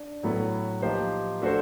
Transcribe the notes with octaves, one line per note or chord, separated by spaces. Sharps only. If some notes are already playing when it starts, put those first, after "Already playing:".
Already playing: D4
A2 F#3 B3 E4 A4
F3 A#3 D#4 G4 C5
A3 D4 F#4 A4 C5